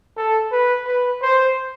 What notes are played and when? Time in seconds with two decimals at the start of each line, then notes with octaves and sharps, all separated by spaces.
0.17 A4
0.52 B4
0.87 B4
1.22 C5